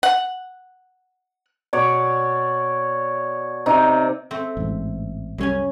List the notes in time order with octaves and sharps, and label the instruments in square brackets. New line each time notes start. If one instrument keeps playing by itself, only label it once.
[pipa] F#5
[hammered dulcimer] B2 C#5 D5
C3 D#4 D5
[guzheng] A3 C4
[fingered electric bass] A1 G#2
[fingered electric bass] C2 G3 [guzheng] F#2 C#4 G#5